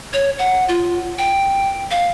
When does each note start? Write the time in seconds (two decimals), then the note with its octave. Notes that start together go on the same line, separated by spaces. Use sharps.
0.13 C#5
0.39 F#5
0.68 F4
1.18 G5
1.91 F5